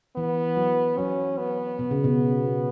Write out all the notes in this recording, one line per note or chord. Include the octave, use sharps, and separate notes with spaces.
E3 B3
F#3
F#3 C#4
B3
B2
C#3
B2